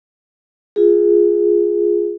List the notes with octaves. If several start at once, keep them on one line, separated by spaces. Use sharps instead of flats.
F4 G#4